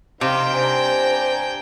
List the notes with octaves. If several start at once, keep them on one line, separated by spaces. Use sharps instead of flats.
C3 D#4 C5 F5 G5
D4 C5 G#5 A#5